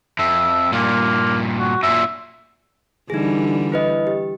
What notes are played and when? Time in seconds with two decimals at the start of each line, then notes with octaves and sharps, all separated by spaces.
0.19 F2 E5
0.72 G2 A#2 A#3
1.59 F#4
1.83 F#2 A#2 E5
3.10 D3 E3 G3 D#4 G#4
3.72 E4 B4 D#5
4.07 G4